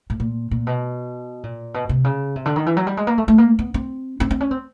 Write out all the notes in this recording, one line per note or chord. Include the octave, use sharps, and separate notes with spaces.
A2
A#2
A#2
B2
A#2
B2
C3
C#3
C3
D3
D#3
E3
F#3
G3
G#3
A#3
A3
A3
A#3
B3
C4
C4
C4
C#4
C4